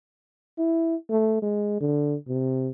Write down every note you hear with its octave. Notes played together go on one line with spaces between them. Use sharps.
E4
A3
G#3
D3
C3